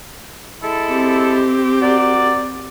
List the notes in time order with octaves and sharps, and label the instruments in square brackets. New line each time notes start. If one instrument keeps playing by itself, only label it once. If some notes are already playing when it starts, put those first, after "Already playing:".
[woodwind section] G#3 E4 A4
[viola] C4 G4
[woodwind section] F#4 A#4 D5